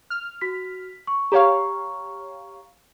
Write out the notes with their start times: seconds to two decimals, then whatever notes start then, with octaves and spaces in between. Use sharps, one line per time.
0.10 F6
0.41 F#4 B6
1.07 C#6
1.32 G4 C#5 F5 A#5 C#6